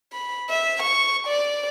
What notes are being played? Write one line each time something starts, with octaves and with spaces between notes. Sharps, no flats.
B5
E5
C#6
D5